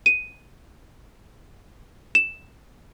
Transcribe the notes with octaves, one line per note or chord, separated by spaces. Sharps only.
D#7
E7